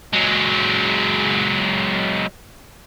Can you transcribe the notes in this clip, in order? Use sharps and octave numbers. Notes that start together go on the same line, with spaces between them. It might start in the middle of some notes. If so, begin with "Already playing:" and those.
F#3 G#3